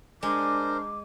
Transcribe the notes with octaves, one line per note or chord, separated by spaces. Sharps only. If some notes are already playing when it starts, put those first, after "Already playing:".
G#3 D4 A#4 C5 D6